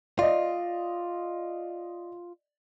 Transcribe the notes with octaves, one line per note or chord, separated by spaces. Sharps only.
F4 D5 D#5